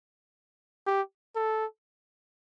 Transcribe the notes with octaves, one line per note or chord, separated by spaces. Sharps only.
G4
A4